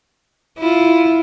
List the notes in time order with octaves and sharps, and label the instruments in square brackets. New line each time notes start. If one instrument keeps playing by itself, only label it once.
[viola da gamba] E4 F4